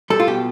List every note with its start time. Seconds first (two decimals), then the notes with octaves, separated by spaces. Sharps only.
0.10 G3 A4
0.20 F4
0.27 B2 G4